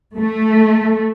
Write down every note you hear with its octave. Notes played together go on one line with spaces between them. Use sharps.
A3